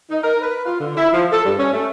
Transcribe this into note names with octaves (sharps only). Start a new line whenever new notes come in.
D#4
A#4
B4
F4
D3
E4
F3
A4
G2
C#4
A3